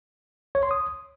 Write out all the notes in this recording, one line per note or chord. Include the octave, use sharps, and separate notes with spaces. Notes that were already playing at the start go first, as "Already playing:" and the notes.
C#5
C6
D#6